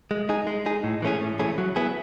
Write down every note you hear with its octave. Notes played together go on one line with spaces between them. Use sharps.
G#3
D#4 G#4
G#3
D#4 G#4
A2
E3 A3 C#4 G#4
A2
E3 A3 C#4 G#4
F#3
B3 E4 G#4